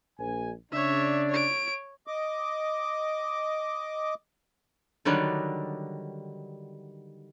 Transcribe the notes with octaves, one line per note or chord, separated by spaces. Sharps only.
A#1 G#5
C#3 D4 C#5 D5 E5
C#5 D7
D#5 D6
D3 D#3 F#3 G3 D4